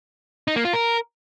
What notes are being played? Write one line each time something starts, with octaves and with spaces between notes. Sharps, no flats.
D#4
A#3
F4
A#4